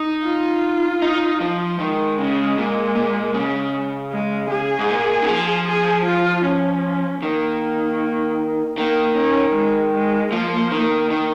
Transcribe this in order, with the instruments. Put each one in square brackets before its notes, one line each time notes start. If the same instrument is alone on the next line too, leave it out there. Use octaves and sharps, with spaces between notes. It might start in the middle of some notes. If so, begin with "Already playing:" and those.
Already playing: [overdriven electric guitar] D#4
[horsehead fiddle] F4
[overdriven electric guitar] D#4
F3
[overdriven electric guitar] D#3 [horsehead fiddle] G#3
[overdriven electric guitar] C#3
A#2
A#2
C#3
[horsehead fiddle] G#3
G#4
[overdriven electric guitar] G#2
A#2
D#3
F3
[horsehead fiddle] G#4
F4
C#4
[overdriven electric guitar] D#3 [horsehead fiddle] A#3
[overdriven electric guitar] D#3 [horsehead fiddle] A#3
[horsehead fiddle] C#4
G#3
G#3
[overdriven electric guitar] F3 [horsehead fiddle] A#3
[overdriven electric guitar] D#3
D#3